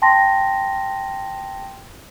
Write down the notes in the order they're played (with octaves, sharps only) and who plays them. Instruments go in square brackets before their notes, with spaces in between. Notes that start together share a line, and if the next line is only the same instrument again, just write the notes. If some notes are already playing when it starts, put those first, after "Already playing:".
[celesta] G5 A5 C6 A#6